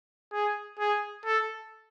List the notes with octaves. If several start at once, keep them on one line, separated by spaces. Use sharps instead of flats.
G#4
G#4
A4